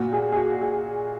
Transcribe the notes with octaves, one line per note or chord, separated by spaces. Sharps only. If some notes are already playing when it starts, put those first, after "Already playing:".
Already playing: A#2 F#4
G#4
G#4
F#4
G#4